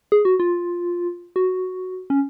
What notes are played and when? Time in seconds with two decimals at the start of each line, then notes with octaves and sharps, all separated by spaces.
0.12 G#4
0.25 F#4
0.40 F4
1.36 F#4
2.10 C#4